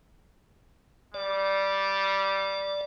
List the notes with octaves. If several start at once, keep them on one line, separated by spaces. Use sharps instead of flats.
G3 D5